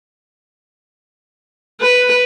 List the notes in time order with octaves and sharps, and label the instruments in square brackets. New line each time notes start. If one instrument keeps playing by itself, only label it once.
[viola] B4